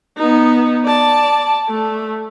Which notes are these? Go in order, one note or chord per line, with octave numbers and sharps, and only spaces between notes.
B3 D#4
D5 A5
A3